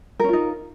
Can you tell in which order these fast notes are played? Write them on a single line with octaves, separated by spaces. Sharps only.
A#4 C#4 F4 D#4